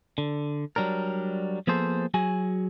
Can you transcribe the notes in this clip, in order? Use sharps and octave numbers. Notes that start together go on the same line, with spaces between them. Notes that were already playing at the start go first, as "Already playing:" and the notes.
D3
F#3 G3 D4 A#4
F3 A#3 B3 G#4 A4 C5
F#3 F#4 G#4 G#5